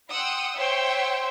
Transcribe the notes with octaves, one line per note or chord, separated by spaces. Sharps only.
F#5 G5 C6 D#6 E6
C5 C#5 E5 G5 C6 E6